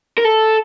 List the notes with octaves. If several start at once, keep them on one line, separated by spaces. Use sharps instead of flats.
A#4
A4